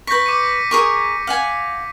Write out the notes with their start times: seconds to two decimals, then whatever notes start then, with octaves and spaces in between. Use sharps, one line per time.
0.07 B4 C#6 G6 A#6 B6
0.26 D6 C#7 D#7
0.71 G#4 A#4 C#6
1.27 F5 F#5 G#5